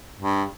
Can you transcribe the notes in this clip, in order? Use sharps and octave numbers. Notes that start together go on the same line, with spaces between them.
G2